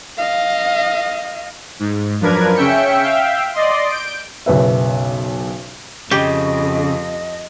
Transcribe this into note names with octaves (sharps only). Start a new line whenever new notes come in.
D#5 F5
G#2
F#2 F3 D4 A#4 B4 G#6
C#3 C#4 E5 G5 C#7
E5 F5 G5
D5 D#5 C6
G6 D7
F#1 B1 B4 E5
F2 C#3 G4 D#5